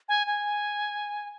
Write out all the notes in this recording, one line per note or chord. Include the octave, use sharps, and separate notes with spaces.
G#5
G#5